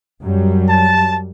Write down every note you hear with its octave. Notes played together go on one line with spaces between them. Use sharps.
F#2 F#3 G3
A5